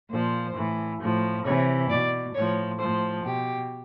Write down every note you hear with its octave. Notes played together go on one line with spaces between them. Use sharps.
A#2 F3 C5
A2 E3
A2 F3
C3 E3 C#5
B2 D5
A2 F3 C#5
A2 F3 C5
B2 G4